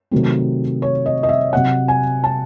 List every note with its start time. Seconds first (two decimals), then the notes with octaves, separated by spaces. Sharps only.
0.11 C3 D#3 F#3 A3 C4
0.82 C#5
1.06 D#5
1.23 D#5
1.29 E5
1.53 C3 F#3 C4 F#5
1.88 G#5
2.24 A5